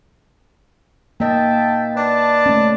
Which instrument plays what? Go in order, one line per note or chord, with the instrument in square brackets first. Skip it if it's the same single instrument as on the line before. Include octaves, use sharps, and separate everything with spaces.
[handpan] A#3 D#5 [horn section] E5 G5 A5
[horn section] D4 B4 A5
[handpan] A3 C#4